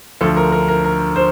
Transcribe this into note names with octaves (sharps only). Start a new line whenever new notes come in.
D2 D3 F3 A4
A#4
A#4
A#4
A#4
C5